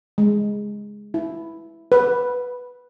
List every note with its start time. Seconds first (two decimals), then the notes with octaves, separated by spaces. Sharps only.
0.18 G#3
1.14 E4
1.92 B4